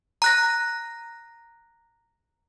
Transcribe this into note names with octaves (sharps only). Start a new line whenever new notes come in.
A#5 F#6 A#6